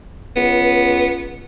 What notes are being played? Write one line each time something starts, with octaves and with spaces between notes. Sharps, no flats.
C#2 B3